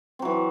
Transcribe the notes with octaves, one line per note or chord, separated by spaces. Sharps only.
E3 F#3 C4